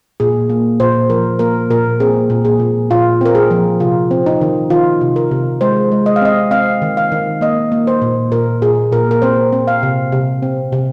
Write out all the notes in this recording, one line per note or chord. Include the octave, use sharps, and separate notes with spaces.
A#2 G#4
A#3
A#2 C5
F3 A#4
A#3 A#4
A#2 A#4
C4 G#4
A#2
G#4
A#2
A#2 F4
C4 A#4
G#4
F3
C3 F4
C4
D#4
D#3
D#3 F4
C3
A#4
C3
G#3 C5
G#3
D#5
F5
C4 D#5
C4 F5
D#3
F5
D#3
A#3 D#5
A#3
C5
A#2
A#2 A#4
A#2 G#4
A#2 A#4
A#4
C4 C5
C4
F5
C3
C3
C4
C3